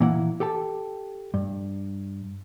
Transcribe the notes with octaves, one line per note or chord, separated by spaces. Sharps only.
A#2 E3 A#3 E4 F#5
G4 A4 G5 A5
G2